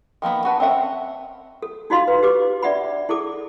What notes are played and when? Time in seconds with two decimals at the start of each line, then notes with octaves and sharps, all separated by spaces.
0.22 D#3 F3 A#3 B3
0.45 F#4 B4 A5
0.60 C4 C#4 E5 F#5
1.62 A4
1.90 D#4 F4 F#4 D#5 F5 C6
2.08 B4
2.23 G4 B4 D6
2.62 D4 D5 E5 F#5 B5
3.09 E4 G#4 A4 D6